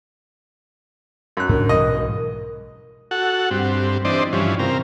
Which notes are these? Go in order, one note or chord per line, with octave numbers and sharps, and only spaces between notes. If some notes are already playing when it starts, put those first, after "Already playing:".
F#2 F#6
G#2 D4 A#4
B1 G#2 E3 D#5
F#4 A4 F#5
G2 C4
E3 C4 D4 C5 D5 D#5
G2 E3 F3 C#4
C3 C4 A#4 F5